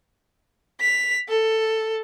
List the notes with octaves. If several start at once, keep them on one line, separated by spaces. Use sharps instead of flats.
B6 F7
A4